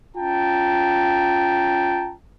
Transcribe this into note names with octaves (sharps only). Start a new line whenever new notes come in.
C#4 F4 G5 A5 A#5